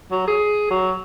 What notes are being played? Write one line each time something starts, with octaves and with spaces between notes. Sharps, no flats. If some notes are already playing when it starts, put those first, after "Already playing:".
F#3
G#4
F#3